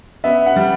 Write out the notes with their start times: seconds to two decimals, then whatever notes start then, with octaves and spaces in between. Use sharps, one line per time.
0.24 B3 E5
0.46 F#5
0.56 G3